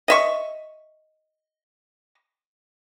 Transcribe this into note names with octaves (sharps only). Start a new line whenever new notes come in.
D#5 E5 C#6